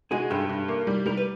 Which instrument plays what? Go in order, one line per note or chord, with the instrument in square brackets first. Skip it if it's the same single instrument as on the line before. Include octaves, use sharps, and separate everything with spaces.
[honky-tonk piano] G#3 [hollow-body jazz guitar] F#4 G#4
[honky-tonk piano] G2 [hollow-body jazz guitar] G4 A4
[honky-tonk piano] G2
A#3
G3
[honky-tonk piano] G3 [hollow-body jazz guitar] A#4
[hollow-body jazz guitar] B4